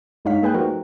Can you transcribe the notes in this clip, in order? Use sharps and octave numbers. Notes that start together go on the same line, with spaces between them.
G2 G#3 D#4 C#5 F5 B6
A#3 G#4 B4 G5 F#6
F3 D#4 F4 F#4 A#4 C5
A3